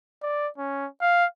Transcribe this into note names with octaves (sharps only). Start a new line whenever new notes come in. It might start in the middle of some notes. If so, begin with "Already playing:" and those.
D5
C#4
F5